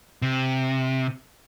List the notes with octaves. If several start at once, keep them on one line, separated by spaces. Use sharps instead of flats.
C3